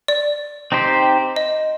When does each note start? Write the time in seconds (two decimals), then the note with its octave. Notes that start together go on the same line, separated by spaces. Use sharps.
0.08 D5
0.72 C4 D#4 G4 C5
1.36 D#5